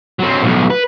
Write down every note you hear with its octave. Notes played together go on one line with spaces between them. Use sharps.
F#3 C4
B1 A2
B4